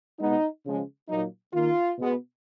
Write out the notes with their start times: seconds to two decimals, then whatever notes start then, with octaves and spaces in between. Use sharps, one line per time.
0.19 B2 G#3 B3 D#4
0.64 C#3 F3 G#3
1.08 A#2 F#3 A#3 D#4
1.53 D#3 A#3 F4
1.98 B2 G#3 B3